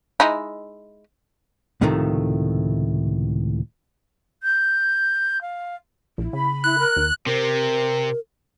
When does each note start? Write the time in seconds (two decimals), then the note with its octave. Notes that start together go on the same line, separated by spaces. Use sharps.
0.20 G#3 D#4 E4
1.81 C#2 A2 C3 D#3 F3 A3
4.43 G6
5.42 F5
6.18 A#1 E4
6.33 C#3 B5
6.64 E4 F#6
6.78 A#4
6.96 D#2
7.26 C3 C4 A#4